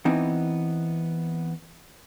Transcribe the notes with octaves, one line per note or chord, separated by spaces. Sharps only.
E3 B3 C4 D#4